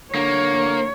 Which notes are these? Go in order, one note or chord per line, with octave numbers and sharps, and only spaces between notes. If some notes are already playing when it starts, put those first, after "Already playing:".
D3 A#3 C#5